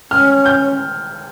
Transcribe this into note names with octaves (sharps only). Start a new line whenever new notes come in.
C#4 F6
G6